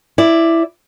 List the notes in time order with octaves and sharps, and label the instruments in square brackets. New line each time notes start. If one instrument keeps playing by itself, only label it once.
[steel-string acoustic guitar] E4 D5